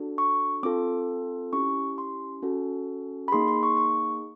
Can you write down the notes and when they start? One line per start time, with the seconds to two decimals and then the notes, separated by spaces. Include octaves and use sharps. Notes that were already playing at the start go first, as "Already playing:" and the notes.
Already playing: D4 F#4 A4
0.18 C#6
0.63 C4 F4 A4 D6
1.53 C#4 E4 G4 C#6
1.98 C6
2.42 C#4 F#4 A4
3.28 B5
3.32 A#3 D#4 G#4 C6
3.48 C6
3.63 C#6
3.77 C#6